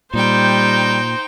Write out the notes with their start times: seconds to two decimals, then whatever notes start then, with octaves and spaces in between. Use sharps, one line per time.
0.14 A#2 G3 D#4 C5 G5